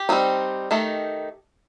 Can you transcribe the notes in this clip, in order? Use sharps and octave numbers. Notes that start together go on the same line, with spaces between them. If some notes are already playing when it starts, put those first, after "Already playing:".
Already playing: G4
G3 C4 D#4
D#3 A3 D#4